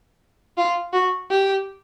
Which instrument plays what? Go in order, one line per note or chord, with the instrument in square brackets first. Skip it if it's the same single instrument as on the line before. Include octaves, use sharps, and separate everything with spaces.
[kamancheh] F4
F#4
G4